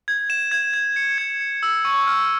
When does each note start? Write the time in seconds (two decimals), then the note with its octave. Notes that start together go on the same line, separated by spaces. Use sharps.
0.08 G#6
0.30 E7
0.51 G#6
0.74 G#6
0.96 C#7
1.18 G#6
1.41 C#7
1.63 E6
1.85 C#6
2.07 F6